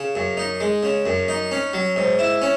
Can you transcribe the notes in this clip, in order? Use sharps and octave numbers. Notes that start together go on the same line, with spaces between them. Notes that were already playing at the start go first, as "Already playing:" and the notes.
Already playing: C#3
F#2
D#4
G#3
C#3
F#2
D#4
C#4
F#3
G#2
E4
C#4